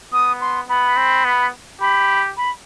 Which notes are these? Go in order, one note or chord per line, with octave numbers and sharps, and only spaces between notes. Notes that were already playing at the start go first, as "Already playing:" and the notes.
B3 D#6
C6
B3 B5
C4
B3
G4 B5
B5